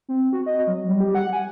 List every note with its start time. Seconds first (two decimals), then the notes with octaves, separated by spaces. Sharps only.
0.09 C4
0.33 F#4
0.46 D#5
0.67 F#3
0.88 G3
1.00 G4
1.15 F#5
1.33 G#5